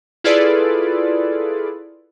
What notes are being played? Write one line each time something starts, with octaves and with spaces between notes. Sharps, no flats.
E4 F4 G#4 A4 B4 D5